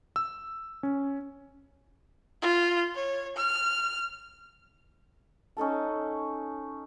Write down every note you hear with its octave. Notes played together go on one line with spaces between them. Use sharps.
E6
C#4
F4
C#5
F6
C#4 D#4 A4 A5